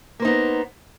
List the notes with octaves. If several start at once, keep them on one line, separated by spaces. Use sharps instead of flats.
A#3 B3 D#4 C5